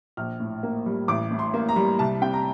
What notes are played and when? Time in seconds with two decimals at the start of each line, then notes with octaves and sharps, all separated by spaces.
0.17 A#1 F6
0.40 A2
0.63 A#3
0.86 G3
1.08 A1 D6
1.31 A2
1.39 C6
1.54 A#3
1.69 A#5
1.76 G3
1.99 C2 A5
2.21 C3 G5
2.33 A#5